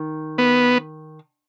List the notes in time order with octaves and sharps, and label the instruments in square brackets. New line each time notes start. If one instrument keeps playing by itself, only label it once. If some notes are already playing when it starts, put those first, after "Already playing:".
Already playing: [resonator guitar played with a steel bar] D#3
[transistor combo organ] B3